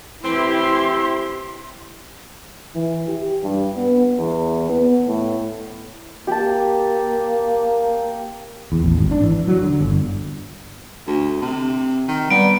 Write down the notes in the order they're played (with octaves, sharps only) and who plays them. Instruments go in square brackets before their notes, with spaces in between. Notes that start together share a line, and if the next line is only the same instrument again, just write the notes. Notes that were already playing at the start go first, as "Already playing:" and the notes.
[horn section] E3 A3 C4 [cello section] E4 G4 [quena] C6
[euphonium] E3
G4
G2
B3
E2
B3
A2
[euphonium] A#3 [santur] G4 A5
[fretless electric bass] E2
A1
G#1
D4
E3
F#3
D3
G1
[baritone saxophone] D2
C3
D#3
[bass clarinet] G3 [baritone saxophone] B3 [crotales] D7